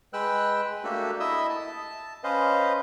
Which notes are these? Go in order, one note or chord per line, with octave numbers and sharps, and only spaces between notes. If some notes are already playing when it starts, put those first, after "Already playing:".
G#3 B4 G5 E6 F#6
A3 A#3 D4 F#4 G4 A4
E4 D#5 E5 D#6 E6
A5
C#4 B4 C5 D#5 F5